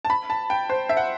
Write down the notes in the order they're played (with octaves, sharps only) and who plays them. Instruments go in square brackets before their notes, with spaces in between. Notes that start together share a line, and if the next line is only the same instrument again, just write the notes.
[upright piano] A5
B5
A5
G5
C5
E5
F#5